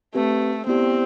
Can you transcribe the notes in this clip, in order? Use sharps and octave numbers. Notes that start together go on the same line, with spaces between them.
A3 C4 G4 B4
B3 C4 E4 G4 D5